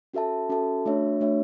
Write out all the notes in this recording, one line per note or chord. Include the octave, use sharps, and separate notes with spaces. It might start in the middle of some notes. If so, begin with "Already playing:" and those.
C#4 F#4 A4 E5 A5
C#4 F#4 A4 E5 A5
A3 D4 F#4 C#5 E5
A3 D4 F#4 C#5 E5